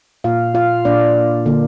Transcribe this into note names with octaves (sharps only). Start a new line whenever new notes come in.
A#2 A#3 F4 F5
F4 F5
A#2 A#3 D4 D5
D3 A#3